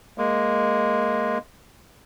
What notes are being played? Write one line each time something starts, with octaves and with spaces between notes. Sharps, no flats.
G#3 A#3